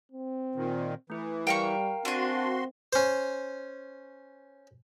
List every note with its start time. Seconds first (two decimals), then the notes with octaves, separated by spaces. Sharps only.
0.12 C4
0.55 A#2 D#3
1.10 E3 A3 E4
1.47 G3 A#4 F5 G5 A#5 C#6
2.05 C4 D4 F#4 G#5 C6
2.93 C#4 C5